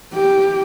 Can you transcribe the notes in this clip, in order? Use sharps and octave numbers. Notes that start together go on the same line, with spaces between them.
G4